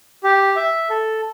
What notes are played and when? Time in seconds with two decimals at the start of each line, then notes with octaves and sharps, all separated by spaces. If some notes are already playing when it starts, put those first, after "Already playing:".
0.23 G4
0.56 E5
0.90 A4